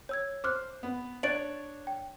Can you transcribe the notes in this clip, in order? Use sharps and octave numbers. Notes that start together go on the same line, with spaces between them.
C#5 E6 G#6
C5 D6 F6 F#6
B3
D4 C#5 F#6 A6 D7 F#7
G5